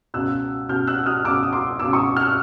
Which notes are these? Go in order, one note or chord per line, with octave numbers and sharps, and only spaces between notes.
C#2 B2 E6 F#6
C#2 B2 F6 G6
E6 F#6
D#6 F6
C#2 B2 D6 E6
D#6
C6 D6
C#2 B2 D6 E6
C#6 D#6
F6
E6 F#6